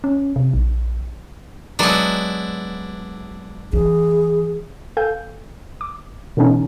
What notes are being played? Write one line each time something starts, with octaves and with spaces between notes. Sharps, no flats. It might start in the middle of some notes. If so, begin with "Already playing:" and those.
C#4
C3
A#1
F#3 G#3 B3 D4 E4
E3 G#4
A4 F5 G5 G#5 G6
D6
B2 D3 E3 B3 C#4 D#4